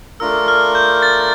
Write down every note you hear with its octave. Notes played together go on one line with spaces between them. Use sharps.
A3 D4 F4 A#4 E6
F6
G6
A6